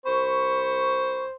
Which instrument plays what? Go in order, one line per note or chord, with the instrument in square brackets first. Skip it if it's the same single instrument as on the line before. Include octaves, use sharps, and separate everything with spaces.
[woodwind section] C2 B5 C#6 [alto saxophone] C5